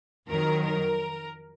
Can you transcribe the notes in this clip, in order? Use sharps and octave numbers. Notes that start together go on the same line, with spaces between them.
F2 D#3 F#3 A#4
A#4